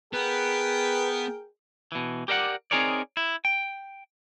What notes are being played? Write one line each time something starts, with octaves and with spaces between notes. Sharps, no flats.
B3 G#4 A#4 B4 G5
B2 E3
G4 A#4 D5 E5 F#5
C4 D#4 G#4 A#4 C#5 D5
E4
G5